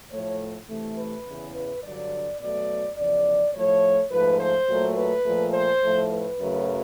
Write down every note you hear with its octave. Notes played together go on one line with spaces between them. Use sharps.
A2 F3 A3 C#5
C3 E3 A3
B4
E2 C#3 E3
B4
G2 D3 F#3 D5
B2 F#3 A3 D5
E2 C#3 F3 D5
A2 F3 A3 C#5
G#2 F3 A3 B4
C5
A#2 F#3 A3
B4
A#2 F3 A3
C5
A2 F3 A3
B4
F#2 C#3 F#3 A3